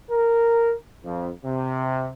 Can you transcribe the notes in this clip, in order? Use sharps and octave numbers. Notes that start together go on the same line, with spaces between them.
A#4
F2
C3